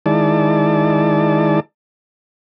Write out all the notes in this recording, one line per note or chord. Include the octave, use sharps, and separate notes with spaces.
D#3 G#3 E4 D5 A5